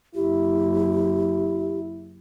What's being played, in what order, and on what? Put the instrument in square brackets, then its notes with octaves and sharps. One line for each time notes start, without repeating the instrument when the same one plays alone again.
[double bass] F#1 [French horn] E4 [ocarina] G4